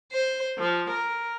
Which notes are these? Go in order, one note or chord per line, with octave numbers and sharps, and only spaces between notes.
C5
F3
A#4